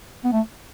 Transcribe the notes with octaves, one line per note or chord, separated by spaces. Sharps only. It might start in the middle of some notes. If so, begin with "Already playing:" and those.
B3
A3